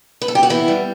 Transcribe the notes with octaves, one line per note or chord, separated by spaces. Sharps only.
B4
A4
G4
F#4
E3 B3 E4
G3